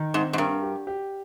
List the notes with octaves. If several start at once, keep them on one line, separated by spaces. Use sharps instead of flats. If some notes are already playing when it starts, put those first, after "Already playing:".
Already playing: D#3
G#2 C4
G#2
G2 A#4
G4
G4